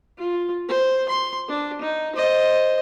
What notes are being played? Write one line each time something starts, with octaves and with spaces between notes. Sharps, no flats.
F4
C5
C6
D4
D#4
C5 D#5